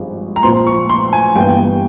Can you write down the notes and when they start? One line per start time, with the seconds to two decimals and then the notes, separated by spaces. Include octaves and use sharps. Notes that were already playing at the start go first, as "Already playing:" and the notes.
Already playing: G#1 G2 F3 G#3
0.36 A#5
0.43 A#1 A#2 F3 C4 C6
0.67 C#6
0.89 C6
1.13 G#5
1.35 G1 G2 E3 G3 A#3 G5